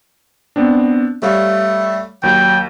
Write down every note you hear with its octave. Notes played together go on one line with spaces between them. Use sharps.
B3 C4 D4
G3 A3 C#5 F5
D#2 F#3 G5